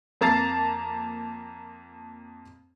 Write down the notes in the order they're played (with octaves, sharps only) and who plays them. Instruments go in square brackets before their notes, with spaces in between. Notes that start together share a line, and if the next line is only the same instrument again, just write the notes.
[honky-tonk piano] F2 A#3 A5 A#5 A6 C7